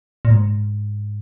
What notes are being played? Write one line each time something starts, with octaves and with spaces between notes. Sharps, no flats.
A#2
G#2